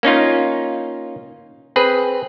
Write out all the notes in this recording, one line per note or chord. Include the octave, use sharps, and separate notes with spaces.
A#3 C#4 D#4 F4
C4 G#4 B4